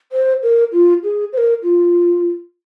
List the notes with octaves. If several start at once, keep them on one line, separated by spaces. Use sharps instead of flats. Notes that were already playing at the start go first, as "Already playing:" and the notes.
C5
A#4
F4
G#4
C5
A#4
F4